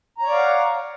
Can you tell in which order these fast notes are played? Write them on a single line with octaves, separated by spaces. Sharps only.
A#5 C#5 D5 F5 F#5